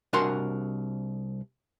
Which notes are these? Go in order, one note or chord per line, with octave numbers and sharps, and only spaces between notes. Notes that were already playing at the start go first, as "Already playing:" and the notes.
C2 D4 F#4 A#4 G#5 C6